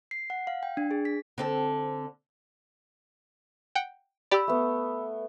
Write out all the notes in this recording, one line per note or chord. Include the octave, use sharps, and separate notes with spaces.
C7
F#5
F5
G5
D4
G#4
B6
D3 C4 A4
F#5 G5
G4 D5 B5 E6
A3 B3